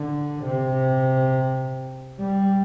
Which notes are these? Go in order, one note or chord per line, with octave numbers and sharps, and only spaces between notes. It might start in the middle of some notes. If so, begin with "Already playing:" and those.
Already playing: D3
C3
G3